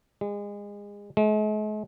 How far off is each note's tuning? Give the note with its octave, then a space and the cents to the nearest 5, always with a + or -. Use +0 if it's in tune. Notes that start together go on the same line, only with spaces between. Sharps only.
G#3 -30
G#3 +45